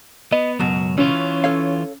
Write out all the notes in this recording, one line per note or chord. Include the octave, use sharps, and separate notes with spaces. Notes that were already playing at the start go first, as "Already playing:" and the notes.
B3 D#5
C#2 F#2 B2 F#3
E3 C#4 F4
A4 C#5 F5